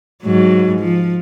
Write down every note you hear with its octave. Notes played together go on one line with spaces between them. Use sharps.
G#2 F#3
F3